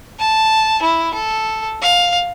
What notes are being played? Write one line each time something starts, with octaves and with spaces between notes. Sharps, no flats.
A5
E4
A4
F5